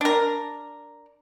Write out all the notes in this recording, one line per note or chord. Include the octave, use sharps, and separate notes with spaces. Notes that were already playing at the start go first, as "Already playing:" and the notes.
D4 A#4